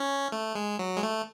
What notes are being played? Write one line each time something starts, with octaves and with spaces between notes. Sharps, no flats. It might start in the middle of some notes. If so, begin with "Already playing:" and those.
Already playing: C#4
A3
G#3
F#3
G#3
A3